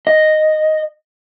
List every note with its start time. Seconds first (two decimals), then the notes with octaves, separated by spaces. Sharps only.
0.07 D#5